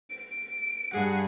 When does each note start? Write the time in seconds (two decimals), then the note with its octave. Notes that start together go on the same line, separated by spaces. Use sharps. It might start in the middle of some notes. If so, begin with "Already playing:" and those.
0.11 D7
0.93 G2 G#4 F#5